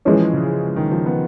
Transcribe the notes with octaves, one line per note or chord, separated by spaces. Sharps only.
E3 F3 G#3 C#4
C#3
D#3
F3
B3